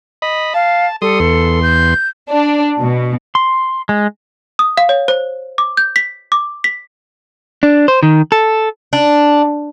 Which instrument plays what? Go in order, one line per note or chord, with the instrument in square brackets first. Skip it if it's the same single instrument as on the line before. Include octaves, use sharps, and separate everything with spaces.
[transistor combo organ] D#5 B5
[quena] F5 [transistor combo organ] A5
[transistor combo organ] G3 C6 D#6 [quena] A4
[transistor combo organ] E2 C6
[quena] G6
[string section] D4
B2
[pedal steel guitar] C6
G#3
[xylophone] D#6
F5
C#5
C5
D6
G6
B6
D6
B6
[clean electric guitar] D4
C5
D#3
A4
[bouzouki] D4